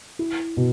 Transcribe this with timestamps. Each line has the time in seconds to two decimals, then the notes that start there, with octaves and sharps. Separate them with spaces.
0.19 E4
0.57 B2